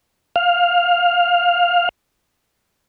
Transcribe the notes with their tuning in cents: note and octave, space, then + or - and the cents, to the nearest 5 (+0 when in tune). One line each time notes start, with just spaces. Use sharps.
F5 +10